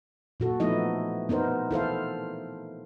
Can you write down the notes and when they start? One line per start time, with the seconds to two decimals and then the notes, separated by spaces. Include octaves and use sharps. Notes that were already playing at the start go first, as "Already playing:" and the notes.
0.40 A#2 F#4 A4
0.60 F3 A3 B3 D#4 E4 D#5
1.29 B3 D#4 A#4 C5
1.71 E4 A4 C5 F5